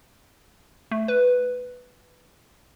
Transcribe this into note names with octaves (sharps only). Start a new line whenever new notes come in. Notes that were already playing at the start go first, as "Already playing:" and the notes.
A3
B4